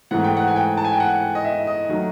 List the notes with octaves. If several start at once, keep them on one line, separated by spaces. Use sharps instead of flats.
G#2 E3 A3 F#5
G5
F#5
G#5
G5
A5
G#5
G5
F#5
D#5
E5
D#5
D#3 F#3 A3